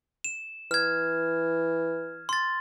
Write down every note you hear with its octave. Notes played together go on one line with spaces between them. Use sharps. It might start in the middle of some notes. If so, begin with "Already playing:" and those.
E7
E3 F6 G#6
C6 A6